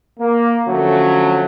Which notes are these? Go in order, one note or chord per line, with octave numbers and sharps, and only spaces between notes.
A#3
D3 F3 F#3 A3 C#4